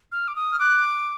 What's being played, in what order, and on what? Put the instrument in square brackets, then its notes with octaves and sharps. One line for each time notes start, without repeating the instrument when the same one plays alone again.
[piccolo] F6
D6
D#6
[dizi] F6
[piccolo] D6 [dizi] F#6